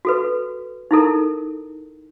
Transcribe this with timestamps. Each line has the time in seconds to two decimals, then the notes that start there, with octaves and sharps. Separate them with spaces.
0.05 F#4 A4 B4
0.91 D#4 E4 A4 A#4